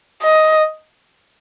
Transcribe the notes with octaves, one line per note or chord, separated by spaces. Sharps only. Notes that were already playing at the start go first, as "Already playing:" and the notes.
D#5